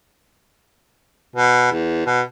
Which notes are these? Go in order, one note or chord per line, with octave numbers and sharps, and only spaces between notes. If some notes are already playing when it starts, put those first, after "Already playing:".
B2
E2
B2